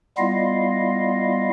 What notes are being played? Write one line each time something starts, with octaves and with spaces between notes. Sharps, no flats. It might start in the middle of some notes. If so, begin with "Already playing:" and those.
G3 B3 E4 F4 D#5 F5